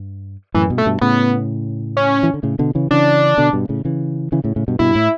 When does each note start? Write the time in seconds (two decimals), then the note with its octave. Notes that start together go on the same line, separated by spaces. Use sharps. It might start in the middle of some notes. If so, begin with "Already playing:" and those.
Already playing: G2
0.54 F#2 A2 E3
0.70 G2 B2
0.78 A3
0.86 G2 B2
1.01 A2 C#3 B3
1.97 C#4
2.23 E3
2.34 D3
2.43 A2 C#3
2.59 B2 D3
2.75 C#3 E3
2.91 C#3 E3 D4
3.38 B2 D3
3.53 G2 B2
3.69 A2 C#3
3.85 C#3 E3
4.32 C#3 E3
4.44 A2 C#3
4.56 A2 C#3
4.68 G2 B2
4.79 G2 B2 E4
4.95 A2